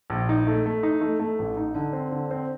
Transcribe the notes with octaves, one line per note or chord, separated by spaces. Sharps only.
A#1
D#4
A3
A3
D#4
A3
A3
A1
D#4
D3
C4
D3
C4